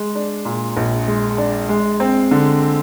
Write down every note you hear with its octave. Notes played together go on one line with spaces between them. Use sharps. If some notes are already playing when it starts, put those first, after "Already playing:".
Already playing: G#3
D4
A#2
A#1
G#3
D4
G#3
C4
D3